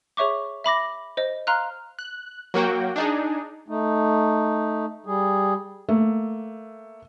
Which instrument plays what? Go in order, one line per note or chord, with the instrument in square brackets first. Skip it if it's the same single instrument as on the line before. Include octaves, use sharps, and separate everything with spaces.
[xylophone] G#4 C#5 E5 C#6 D6
E5 B5 D6 A#6
C5 D#5
F5 A#5 C6 F6 F#6
[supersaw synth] F#6
F#3 A#3 F#4 G5
D4 D#4 G#4
[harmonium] A3 D#4
G3 G#4
[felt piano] A3 A#3